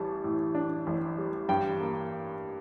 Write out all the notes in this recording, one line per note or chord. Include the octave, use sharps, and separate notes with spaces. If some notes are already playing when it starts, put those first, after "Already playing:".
Already playing: A1 G3 A5
A2
D4
A1
G3
G2 G5
A#3